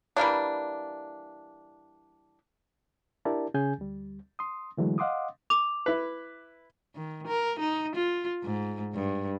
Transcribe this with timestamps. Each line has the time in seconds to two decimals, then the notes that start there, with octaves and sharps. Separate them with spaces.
0.16 E3 G3 A#3 D4
3.25 D4 E4 G4 A#4 D5 A5
3.54 C#3 C#4 G#4 G#5 G6
3.78 D2 G3
4.39 C6 D#6
4.77 D3 E3 F#3 G#3 A3 E4
4.98 D#5 F5 F#5 C6 D6 D#6
5.50 D6 F7
5.86 E4 B4
6.95 D#3
7.27 A#4
7.59 D#4
7.95 F4
8.44 G#2
8.95 G2